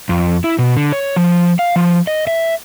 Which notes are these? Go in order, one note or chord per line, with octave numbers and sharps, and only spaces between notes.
F2
E4
B2
D3
C#5
F3
F5
F3
D#5
E5